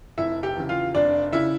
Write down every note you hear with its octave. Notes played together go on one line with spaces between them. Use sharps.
F1 E4 E5
G4 G5
E2 C#3
F4 F5
F1 D4 D5
C#3 E4 E5